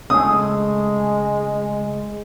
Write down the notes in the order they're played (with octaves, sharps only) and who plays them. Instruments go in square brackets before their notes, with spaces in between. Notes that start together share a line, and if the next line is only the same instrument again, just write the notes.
[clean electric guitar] C#2 A3 G#4 [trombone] G#3 [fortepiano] D#6